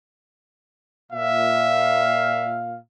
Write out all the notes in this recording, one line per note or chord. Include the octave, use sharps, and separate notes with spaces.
A#2 E5 F5